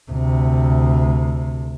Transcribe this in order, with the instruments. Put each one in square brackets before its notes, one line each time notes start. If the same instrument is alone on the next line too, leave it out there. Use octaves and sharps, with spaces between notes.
[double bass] D2 C3